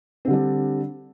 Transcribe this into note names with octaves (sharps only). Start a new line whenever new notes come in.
D3 G3 C4 D4